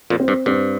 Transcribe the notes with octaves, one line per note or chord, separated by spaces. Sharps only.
F2 A#2
C4
G2
G2 C4